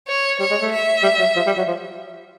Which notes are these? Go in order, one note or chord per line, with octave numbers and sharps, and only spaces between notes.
C#5
G3 C#5
G#3
A3
E5
G3
F#3
F3
G3
F#3
F3